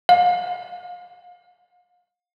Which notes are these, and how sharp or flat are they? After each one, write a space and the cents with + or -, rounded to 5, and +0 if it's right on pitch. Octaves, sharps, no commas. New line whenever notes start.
F5 +35